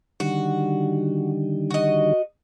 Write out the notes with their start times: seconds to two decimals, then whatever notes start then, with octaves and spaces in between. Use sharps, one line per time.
0.20 D3 D#3 G3 F#4
1.71 F#4 D#5